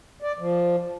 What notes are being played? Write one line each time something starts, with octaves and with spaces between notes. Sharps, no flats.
D5
F3